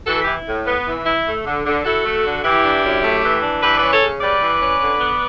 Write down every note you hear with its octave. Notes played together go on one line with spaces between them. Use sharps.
E3 F#4 A4
G4 B4
E4
A2
B3
E3
E4
A3
D3
D3
E4 F#4 A4
A3
D3
E3 E4 G4
D4
F#2
A3
E3
D4
E3 G4 B4
C#4 B4 D5
A4 C#5
C#3
G3 B4 D5
E3
C#4
D3
B3